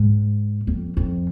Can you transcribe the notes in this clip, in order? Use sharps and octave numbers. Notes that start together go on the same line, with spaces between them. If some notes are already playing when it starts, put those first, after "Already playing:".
Already playing: G#2
F2
F2